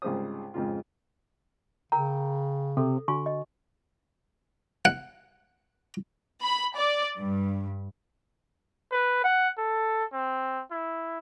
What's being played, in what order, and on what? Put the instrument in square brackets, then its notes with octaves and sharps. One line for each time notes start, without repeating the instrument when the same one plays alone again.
[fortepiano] C2 G#2 C#3 F4 C5 D#6
F2 G#2 C#3 F4
[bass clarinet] C#3 [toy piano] A#4 A#5 [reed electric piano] G5
[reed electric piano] C3 [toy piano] A4
[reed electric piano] D3 [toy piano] F#4 G#5 C#6
[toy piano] D#5
[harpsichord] F#5
[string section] B5
D5
G2
[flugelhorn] B4
F#5
A4
C4
E4